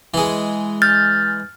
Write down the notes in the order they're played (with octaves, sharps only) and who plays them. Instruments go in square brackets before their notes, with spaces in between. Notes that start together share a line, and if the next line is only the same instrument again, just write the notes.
[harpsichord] E3 G#3
[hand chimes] F6 G6 A6